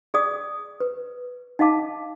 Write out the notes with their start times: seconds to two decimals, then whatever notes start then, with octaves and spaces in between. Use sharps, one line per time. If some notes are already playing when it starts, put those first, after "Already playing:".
0.14 G#4 D5 D#6
0.80 B4
1.59 D#4 D#5 F5 A5 D6